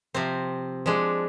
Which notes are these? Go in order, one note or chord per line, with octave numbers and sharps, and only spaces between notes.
C3 F3 C4
F3 G#3 D4